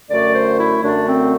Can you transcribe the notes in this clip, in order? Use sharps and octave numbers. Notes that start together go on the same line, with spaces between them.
F#2 D3 A3 D5
C5
E4
F#2 D3 A3 D4
C4